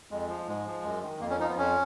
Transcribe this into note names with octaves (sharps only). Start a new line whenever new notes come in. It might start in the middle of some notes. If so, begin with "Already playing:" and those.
F2 G#3
F3
G#2 G#3
F3
F#2
D#3
F2 A#3
C#4
F3 D#4
B3
F2 C#4